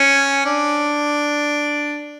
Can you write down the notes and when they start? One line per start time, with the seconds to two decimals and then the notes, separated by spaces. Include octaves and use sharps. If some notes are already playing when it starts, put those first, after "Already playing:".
Already playing: C#4
0.45 D4